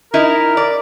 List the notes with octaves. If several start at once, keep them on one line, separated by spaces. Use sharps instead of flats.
D#4 E4 A#4
D5